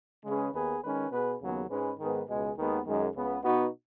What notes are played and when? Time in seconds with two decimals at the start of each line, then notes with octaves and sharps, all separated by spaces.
0.25 C#3 G#3 C#4 G#4 B4
0.53 D#2 D#3 B3 G#4 B4
0.83 D#3 G#3 C#4 B4
1.11 B2 B3 G#4 B4
1.41 D#2 C#3 F#3 B3 G#4
1.69 G#2 G#3 C#4 B4
1.99 G#2 D#3 B3 G#4 B4
2.28 C#2 B2 G#3
2.57 D#2 D#3 G#3 B3
2.85 F#2 D#3 G#3 D#4
3.15 C#2 C#3 B3
3.44 B2 B3 D#4 F#4